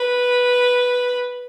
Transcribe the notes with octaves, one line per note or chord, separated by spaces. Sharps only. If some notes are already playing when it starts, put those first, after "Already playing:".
Already playing: B4